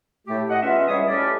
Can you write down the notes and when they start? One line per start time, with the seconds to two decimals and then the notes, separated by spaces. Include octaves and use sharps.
0.27 A2 A3 G4
0.49 D#5 F#5
0.62 E2 C#4 F4 E5
0.87 C#2 G3 G#4 C#5 D#5 D#6
1.06 A2 C#4 G4 D5